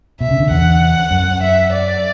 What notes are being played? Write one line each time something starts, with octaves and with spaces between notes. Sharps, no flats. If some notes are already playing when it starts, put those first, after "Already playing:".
B2 E5
C#3
D3
E2 F#5
F#2
E5
D5